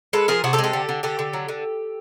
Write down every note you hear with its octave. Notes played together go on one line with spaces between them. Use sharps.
G#3 A4 B4
F3 G#4 A#4
C3 F#4 G#4
G4 A4
G#3
G4 A4
D3
D3
D3 G4 A4
D3
F#3
D3